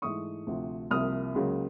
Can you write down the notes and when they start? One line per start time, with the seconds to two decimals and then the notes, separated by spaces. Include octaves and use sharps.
0.02 G#2 E3 A3 C#6 D#6
0.47 D2 C3 F3
0.91 C2 C3 F3 A#3 D#6 F6
1.35 C#2 C#3 F#3 A#3